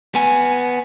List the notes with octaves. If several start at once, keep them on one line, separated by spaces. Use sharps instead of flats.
B3 G#5